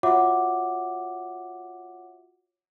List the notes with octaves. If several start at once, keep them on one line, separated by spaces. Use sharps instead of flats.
F4 F#4 C#5 E5 F#5 D6